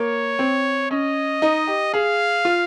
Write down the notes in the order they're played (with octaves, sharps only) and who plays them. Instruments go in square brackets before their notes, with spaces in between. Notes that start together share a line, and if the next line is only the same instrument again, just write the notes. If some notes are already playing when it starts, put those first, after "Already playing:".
Already playing: [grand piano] A#3 [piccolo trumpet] C#5
[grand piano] C4
[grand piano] C#4 [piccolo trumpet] D#5
[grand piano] D#4
G4
[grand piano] G#4 [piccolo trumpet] F5
[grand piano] F4